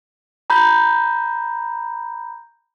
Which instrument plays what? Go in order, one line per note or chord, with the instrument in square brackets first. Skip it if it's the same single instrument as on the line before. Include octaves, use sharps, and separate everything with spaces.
[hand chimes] A#5 B5 G6